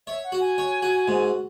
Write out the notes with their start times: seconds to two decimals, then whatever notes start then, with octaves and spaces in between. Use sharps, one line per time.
0.07 C#5 E5
0.24 F#5
0.32 F#4
0.40 G#5
0.58 C#5
0.82 F#4
1.08 G#2